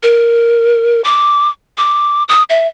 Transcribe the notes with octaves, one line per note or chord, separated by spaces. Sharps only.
A#4
D6
D6
D#6
E5